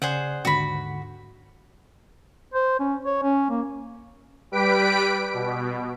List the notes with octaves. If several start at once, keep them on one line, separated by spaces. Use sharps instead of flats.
C#3 G#4 C5 D5 F#5
D#2 G#2 D3 F#4 B5
C5
C#4
C#5
C#4
A#3
G3 G4 B4 B6 D7
B2